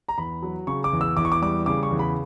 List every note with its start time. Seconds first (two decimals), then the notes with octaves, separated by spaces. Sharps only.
0.08 A#5
0.18 E2 B5
0.42 F#3
0.67 C#3 C#6
0.84 D6
0.93 E2
1.01 E6
1.17 E2 D6
1.25 C#6
1.32 D6
1.42 G3 D6
1.66 C#3 D6
1.83 C#6
1.91 E2
1.99 B5